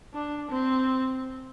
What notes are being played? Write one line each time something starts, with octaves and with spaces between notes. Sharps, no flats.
D4
C4